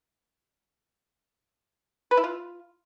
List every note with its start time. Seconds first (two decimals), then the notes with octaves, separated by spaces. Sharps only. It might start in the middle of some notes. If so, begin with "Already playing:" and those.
2.11 B4
2.17 E4
2.24 F4